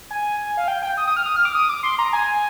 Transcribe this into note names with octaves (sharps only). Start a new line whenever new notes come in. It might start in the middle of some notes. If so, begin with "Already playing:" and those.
G#5
F5
G5
G5
D#6
D#6
F6
D#6
F6
D6
D#6
D6
C6
A#5
G#5